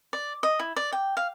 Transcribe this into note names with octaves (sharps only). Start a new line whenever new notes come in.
D5
D#5
E4
D5
G5
F5